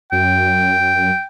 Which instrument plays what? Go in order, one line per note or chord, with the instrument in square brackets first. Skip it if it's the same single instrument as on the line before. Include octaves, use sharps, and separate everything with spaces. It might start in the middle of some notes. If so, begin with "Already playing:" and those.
[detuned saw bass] F#2 [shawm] G5